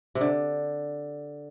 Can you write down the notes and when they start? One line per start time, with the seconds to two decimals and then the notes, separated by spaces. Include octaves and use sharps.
0.15 C3
0.21 D3